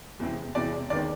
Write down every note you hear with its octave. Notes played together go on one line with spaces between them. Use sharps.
E2 C3 E3 G#3 C4
E2 C3 E3 G#3 C4 D5
D#2 D#3 G#3 B3 D5